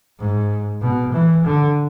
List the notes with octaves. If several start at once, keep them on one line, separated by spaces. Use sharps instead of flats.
G#2
B2
E3
D3